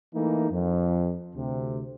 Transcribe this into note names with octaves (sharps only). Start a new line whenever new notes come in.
E3 A3 A#3 D#4
F2
D2 C3